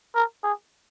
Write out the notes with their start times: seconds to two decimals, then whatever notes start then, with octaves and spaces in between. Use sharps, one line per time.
0.15 A#4
0.43 G#4